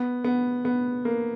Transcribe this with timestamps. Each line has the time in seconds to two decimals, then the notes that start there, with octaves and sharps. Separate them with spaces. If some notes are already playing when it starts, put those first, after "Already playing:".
Already playing: B3
0.24 B3
0.65 B3
1.05 A#3